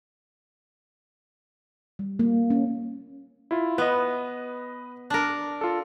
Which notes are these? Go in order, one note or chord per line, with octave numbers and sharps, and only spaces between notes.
G3
A#3
C#4
E4 F4
B3 B4 D#5
D4 A#4
F4 A4